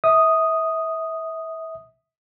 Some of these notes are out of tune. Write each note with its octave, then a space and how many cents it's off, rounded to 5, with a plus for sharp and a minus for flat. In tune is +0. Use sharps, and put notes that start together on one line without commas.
E5 -30 D#6 +0